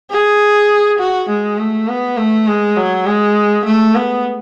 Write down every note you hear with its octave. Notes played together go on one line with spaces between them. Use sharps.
G#4
F#4
G#3
A3
B3
A3
G#3
F#3
G#3
A3
B3